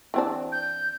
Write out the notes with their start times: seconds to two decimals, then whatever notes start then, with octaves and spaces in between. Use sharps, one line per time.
0.14 E3 C4 D4
0.52 G6